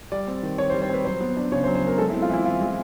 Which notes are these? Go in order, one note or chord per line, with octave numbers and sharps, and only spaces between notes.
G3 D5
C4
D#3
D#3 C#5
C5
G3
C5
C4 B4
F#3 C5
B3
D4
C#3 C#5
C5
F#3
C5
B3 A#4
G#3 A4
E4
C4
F4
E3 E4
E3 F4
G#3